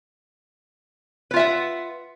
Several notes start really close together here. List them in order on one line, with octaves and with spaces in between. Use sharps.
B4 F4 E5 F#5